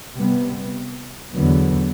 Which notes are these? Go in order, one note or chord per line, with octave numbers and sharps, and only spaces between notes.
C3 G3 B3
E2 D3 F#3 B3